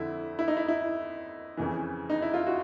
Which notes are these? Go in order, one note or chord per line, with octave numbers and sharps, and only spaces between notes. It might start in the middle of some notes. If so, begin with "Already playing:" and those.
Already playing: F2 D3 E4
E4
D#4
E4
E4
F2 C#3 E3
D#4
E4
F4
F#4